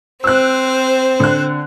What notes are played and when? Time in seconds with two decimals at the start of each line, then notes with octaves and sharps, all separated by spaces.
0.24 C4 C5 E6 F#6
1.20 D3 F#6